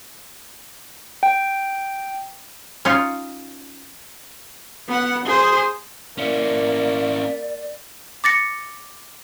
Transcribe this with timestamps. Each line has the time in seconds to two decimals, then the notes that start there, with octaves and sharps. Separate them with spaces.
1.23 G5
2.85 C#4 D#4 F4
4.88 B3 F#5
5.25 G#4 C5
6.18 A#3 C#4 E4 D5
8.24 D6 A6 A#6 C#7